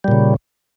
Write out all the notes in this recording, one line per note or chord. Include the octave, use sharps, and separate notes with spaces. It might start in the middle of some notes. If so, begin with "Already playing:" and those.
A#2 C#3 G3